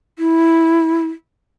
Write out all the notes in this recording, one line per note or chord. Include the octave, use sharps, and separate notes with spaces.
E4